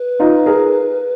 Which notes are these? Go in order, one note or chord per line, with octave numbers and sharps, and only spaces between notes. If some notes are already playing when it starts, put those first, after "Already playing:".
Already playing: B4
D#4 F4
G#4 A#4